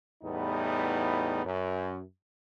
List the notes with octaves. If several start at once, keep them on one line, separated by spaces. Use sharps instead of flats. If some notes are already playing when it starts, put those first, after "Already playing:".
E2 A2 G3 B3 D#4
F#2